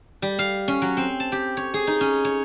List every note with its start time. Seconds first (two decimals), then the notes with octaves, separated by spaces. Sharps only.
0.22 G3
0.39 F5
0.68 C#4
0.82 F#3
0.97 C4
1.20 A5
1.32 G4
1.57 C#5
1.74 G#4
1.87 D#4
2.01 C#4
2.25 C#5